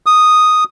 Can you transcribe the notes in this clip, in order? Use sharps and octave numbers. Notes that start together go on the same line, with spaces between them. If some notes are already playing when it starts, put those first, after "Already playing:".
D#6